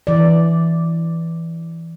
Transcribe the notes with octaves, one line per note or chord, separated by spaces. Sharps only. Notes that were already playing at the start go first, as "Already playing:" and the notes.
E3 D5